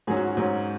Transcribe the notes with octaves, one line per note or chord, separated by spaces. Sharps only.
G#2 F#3 C#4 G#4
F#4
F#4
G#2 F#3 C#4